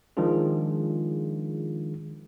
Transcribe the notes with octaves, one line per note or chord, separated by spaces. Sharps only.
D#3 F3 G#3 D4 F4 G#4